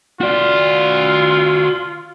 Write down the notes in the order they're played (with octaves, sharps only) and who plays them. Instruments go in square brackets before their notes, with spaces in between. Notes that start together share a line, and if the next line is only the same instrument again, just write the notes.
[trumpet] F4 [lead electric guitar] F#4 D5